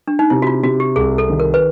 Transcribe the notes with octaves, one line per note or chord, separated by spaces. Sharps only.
D4
D#4
C3 E4
F#4
F4
C3 F#4
G4
C2 G#4
A4
D#3
A#4
B4